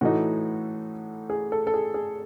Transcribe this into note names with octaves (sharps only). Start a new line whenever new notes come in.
A2 E3 A3 D#4 F#4
G#4
A4
A4
G#4
G#4